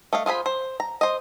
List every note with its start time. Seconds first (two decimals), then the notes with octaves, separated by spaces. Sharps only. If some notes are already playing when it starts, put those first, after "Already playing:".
0.13 A3 D#5 F5
0.26 F4 G#4 C5 B5
0.46 C5
0.80 A#5
1.01 C5 D#5